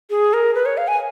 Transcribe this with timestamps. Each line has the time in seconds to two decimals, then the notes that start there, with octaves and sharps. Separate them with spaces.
0.10 G#4
0.33 A#4
0.55 B4
0.66 C#5
0.77 F5
0.88 G#5